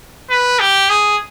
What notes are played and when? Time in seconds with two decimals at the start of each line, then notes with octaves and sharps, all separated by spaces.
0.30 B4
0.60 G4
0.90 G#4